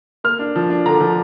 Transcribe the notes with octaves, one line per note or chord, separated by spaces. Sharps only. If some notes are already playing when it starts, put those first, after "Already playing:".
A#3 F6
D4
F3
D4
D3 A#5
F3